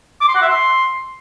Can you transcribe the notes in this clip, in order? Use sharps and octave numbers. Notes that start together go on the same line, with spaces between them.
D6
C6
F#5
E5
C6